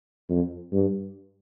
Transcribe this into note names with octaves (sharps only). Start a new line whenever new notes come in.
F2
G2